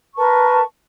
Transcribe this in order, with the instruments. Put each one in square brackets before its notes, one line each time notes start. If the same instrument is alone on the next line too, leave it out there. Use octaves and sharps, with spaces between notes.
[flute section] A#4 B4 A5 C#6